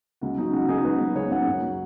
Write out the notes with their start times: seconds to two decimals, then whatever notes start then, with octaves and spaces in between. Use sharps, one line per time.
0.21 C#2 F#4
0.37 C#3 F#3 D#4
0.53 C#2 F#4
0.68 C#3 D#4 G#4
0.73 F#3
0.84 C#2 F#4 B4
1.01 C#3 F#3
1.15 C#2 G#4 C#5
1.31 C#3 F#3 C#5 F#5
1.47 F#2
1.63 F#3